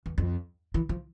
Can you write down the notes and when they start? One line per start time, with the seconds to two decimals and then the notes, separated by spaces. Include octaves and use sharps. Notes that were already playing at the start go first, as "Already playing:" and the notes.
0.06 E2
0.18 F2
0.74 E3
0.89 F3